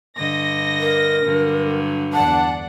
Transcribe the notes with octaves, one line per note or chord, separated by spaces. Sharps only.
G2 D3 D#5 A#6
A#4
G2 D3 F#3
E2 D4 F#5 A5